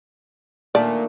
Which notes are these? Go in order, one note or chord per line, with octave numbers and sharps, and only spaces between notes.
A#2 D#3 A3 D4 D5